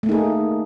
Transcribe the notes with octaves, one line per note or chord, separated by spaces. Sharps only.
A3 A#3 D#4 G#4